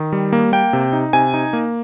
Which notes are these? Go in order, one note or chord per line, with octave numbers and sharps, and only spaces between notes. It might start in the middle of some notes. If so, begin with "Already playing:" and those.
Already playing: D#3
G3
A#3
A#3 G5
C3
D#4
C3 G#5
D#4
A#3